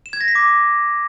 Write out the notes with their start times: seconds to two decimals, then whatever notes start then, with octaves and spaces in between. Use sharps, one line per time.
0.06 E7
0.13 G#6
0.21 A#6
0.28 B6
0.35 D6